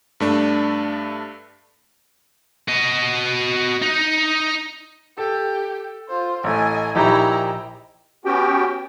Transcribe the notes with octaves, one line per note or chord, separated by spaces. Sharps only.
G2 A3 D4
F#4 D#5
D#4
G4 A4
F4 C5
A1 A3 D#5 G#5
A#1 D#4 E4 G4 A#5
B3 C#4 F#4 G4 G5